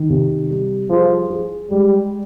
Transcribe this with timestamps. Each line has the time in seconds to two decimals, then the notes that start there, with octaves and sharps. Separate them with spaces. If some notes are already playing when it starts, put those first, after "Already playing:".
Already playing: D#3
0.10 C3
0.50 G3
0.90 F3 G#4
1.31 G#4
1.71 G3 G#3